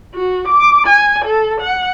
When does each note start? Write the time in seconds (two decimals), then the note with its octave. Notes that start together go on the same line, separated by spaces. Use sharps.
0.15 F#4
0.48 D6
0.87 G#5
1.25 A4
1.61 F#5